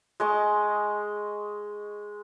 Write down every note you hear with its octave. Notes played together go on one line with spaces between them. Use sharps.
G#3 D#5 C#6